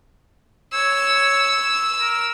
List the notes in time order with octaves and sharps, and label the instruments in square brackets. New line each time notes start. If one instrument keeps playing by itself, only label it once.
[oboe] C#5 [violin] E6
[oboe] A#4